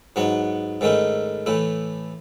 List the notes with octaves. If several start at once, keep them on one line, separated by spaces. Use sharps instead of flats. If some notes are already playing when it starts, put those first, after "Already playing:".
G#2 F#3 B3 F#4
G#2 D#3 A3 C#4 E4
A2 E3 A3 E4